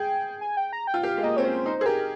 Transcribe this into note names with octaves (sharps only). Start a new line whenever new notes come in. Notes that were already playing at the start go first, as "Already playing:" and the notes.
Already playing: G#4 G5
G#5
G5
A#5
G5
F4
G4 F5
G#3
A#3 D#5
C4 C#5
C#4 C5
D#4 C5
G#4 C5
G4 A#4